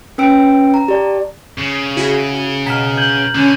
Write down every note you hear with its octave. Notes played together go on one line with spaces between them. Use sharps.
C#4 B4 G5 E6 D7
A#5
G4 D5 A5
C#3
E4 F#4 G#4
B2 A#5 F6 B6 E7
G6 G#6 F#7
D3 C#4